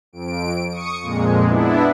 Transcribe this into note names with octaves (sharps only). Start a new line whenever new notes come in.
F2 D7
C#6 D#6 C#7
F2 A#2 G#3
B3 D4 E4